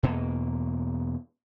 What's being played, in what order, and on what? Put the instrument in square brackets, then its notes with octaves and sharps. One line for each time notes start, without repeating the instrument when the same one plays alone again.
[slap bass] E2 B2 A#3